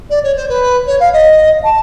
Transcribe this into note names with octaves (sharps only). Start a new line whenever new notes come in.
D5
C#5
C5
B4
C#5
F5
D#5
A5